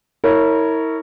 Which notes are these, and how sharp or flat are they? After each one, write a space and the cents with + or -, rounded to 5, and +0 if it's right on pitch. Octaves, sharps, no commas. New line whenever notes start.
E4 -35 A#4 -25 C#5 +0